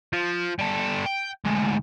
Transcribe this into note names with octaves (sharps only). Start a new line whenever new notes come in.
F3
G3 A4
G5
D2 G#2